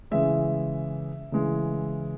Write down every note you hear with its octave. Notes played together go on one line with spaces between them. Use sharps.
C#3 E3 G#3 E5
C#3 E3 G#3